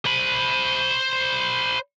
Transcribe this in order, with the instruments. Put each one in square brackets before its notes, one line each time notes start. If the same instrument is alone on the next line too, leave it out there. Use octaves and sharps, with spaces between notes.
[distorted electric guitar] C5 B5